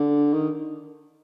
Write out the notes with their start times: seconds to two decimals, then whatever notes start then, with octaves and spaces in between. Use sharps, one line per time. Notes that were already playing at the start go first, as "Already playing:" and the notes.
Already playing: D3
0.33 D#3